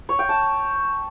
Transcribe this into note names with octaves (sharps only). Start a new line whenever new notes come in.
C#5
G5
A5